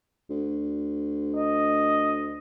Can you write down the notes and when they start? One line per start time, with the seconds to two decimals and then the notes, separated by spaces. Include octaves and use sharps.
0.30 D2
1.36 D#5